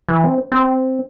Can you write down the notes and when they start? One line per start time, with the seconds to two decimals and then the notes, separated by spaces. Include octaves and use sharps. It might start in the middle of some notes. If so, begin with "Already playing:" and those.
0.09 E3
0.24 C4
0.52 C4